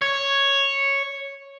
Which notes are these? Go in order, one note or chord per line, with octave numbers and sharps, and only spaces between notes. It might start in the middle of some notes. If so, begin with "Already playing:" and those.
C#5